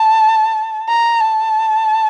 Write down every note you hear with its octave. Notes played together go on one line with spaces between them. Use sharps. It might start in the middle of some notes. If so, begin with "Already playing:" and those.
Already playing: A5
A#5
A5